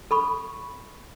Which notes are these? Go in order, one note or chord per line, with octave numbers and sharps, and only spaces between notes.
A4 B5 C#6